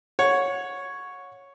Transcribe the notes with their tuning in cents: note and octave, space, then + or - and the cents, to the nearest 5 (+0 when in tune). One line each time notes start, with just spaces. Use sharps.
C#5 +0 F#5 -30